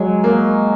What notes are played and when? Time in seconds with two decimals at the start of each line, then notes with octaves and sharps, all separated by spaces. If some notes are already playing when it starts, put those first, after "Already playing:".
Already playing: F#3 G#3
0.24 A#3